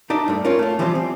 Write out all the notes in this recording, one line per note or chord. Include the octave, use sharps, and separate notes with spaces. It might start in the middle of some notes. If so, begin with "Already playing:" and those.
D4 D#4 D5 E5
G2 A3
C#4 F4 A#4
A3 F4
E3 F3 G3 C4 F4
C4